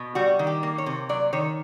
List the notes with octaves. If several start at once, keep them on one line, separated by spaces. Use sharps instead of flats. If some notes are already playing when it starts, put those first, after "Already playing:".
Already playing: B2
G3 F#4
D#3
G4
A#3
C#5
C3
F#3 D5
D#3 C#5